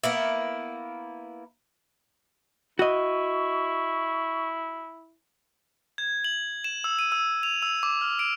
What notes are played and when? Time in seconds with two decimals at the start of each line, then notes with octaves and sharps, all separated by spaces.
0.03 A#3 B3 E4
2.79 E4 F#4 D#5 C#6
5.98 G#6
6.24 F#7
6.64 E7
6.84 E6
6.99 D#7
7.12 E6
7.43 F7
7.62 E6
7.83 D6
8.01 F6
8.19 D7